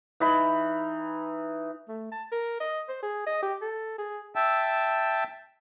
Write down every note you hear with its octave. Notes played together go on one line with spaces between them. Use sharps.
E3 D#4 B5
A3
A5
A#4
D#5
C5
G#4
D#5
G4
A4
G#4
E5 G5 A5 E6